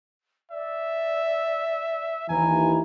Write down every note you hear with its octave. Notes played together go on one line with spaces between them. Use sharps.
D5 E5
D#2 E3 G#5 A#5